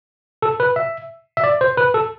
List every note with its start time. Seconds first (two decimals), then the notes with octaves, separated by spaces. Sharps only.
0.42 A4
0.60 B4
0.76 E5
1.37 E5
1.44 D5
1.61 C5
1.77 B4
1.94 A4